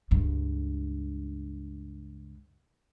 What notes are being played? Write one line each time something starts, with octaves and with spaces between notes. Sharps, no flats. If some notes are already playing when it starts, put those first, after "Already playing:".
C#2 G2